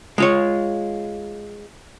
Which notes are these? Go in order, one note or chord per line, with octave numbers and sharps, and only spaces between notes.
G#3 F4 C#5